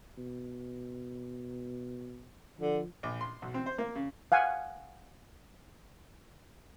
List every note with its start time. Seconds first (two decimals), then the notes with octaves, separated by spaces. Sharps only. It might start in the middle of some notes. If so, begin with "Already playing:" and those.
0.18 B2
2.59 D3 F3
3.03 A#1
3.21 C6
3.42 B1
3.54 C4
3.66 C5
3.78 A#3
3.95 C#3
4.32 F5 F#5 G#5